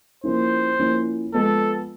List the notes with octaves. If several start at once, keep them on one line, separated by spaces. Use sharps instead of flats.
F3 A#3 C#4 E4 C5
F3 A#3 C#4 E4
F3 G#3 B3 A4